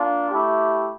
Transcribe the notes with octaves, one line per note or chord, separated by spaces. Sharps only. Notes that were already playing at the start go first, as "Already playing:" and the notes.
Already playing: A#3 D4 F4
A3 E4 G4